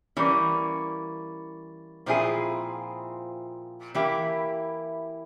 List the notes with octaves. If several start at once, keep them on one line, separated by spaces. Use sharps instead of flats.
E3 G3 A#3 C#4
A#2 F3 C4 E4 G#4
E3 A#3 E4 G4